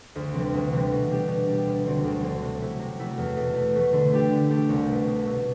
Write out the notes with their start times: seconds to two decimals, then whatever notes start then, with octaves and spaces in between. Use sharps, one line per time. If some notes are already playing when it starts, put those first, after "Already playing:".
0.15 D2
0.33 C3 E3 G3 C4
0.54 D2
0.72 C3 E3 G3 C4
0.91 B2
1.10 G3 D4 G4
1.28 B2
1.47 G3 D4 G4
1.66 D2
1.86 D3 F#3 C4
2.04 D2
2.23 D3 F#3 C4
2.42 C3
2.61 F#3 A3 E4
2.79 C3
2.99 F#3 A3 E4
3.18 E2
3.37 B2 A3
3.55 E2
3.74 B2 A3
3.93 D3
4.12 A3 D4 G4
4.31 D3
4.50 A3 D4 G4
4.69 C2
4.88 B2 A3
5.07 C2
5.26 B2 A3